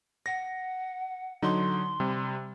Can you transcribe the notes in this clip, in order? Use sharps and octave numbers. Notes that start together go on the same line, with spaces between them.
F#5 A#6
D3 F#3 D#4 C6
C3 G3